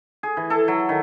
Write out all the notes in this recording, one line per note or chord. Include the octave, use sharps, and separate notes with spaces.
G#4
E3
A4
F#3
D#3